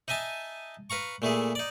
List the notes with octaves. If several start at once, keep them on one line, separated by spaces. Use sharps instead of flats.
D#4 D#5 E5 G#5 A5
B4 F5 A#5 C#6
A#2 A3 E4 G#4
D#4 D5